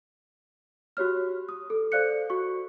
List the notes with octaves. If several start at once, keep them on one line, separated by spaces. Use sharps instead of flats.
F#4 G4 C#5 F6
D#6
A4
A4 C5 D5 F5 F#6 C#7
F#4 C#6